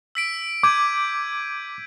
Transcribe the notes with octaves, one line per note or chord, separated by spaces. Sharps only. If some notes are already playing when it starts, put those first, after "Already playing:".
E6 B6 D7
D6 G6 G#6 D#7